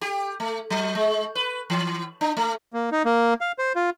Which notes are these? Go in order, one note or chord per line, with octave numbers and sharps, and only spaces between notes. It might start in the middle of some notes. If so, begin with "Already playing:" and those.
G4
A3
F#3
G#3
B4
E3
D4
A3
A#3
D#4
A#3
F5
C5
F4